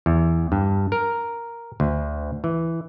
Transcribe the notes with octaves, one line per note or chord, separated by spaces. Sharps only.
E2
G2
A#4
D2
E3